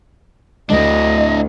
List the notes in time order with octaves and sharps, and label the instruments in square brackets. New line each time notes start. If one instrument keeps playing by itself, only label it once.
[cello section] D2 [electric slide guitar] D4 E4 [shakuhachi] D#5